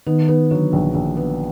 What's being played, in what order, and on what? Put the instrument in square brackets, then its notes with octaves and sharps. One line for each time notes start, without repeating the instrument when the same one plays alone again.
[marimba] D#3 D#4 [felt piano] B3
[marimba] D#3 D#4 [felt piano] B3
[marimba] D3 D4 [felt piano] F#3
[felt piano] A#1
A#1
B3